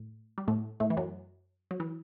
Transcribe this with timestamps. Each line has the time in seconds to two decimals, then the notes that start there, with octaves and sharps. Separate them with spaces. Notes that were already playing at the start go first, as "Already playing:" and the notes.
Already playing: A2
0.38 G3
0.48 A2 A3
0.80 A2 A3
0.90 E3
0.97 F#2 F#3
1.71 F#3
1.80 E3